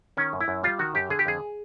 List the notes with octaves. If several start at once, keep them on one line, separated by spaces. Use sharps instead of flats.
D#3 C#4
F#2
E4
F#2
G3 F4
D#3 F#4
F#2 G4
D3 G#4
G4
F2 G#4